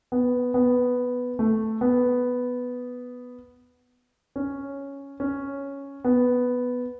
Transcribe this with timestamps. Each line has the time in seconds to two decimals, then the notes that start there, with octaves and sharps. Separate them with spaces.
0.12 B3
0.54 B3
1.39 A3
1.81 B3
4.36 C#4
5.20 C#4
6.05 B3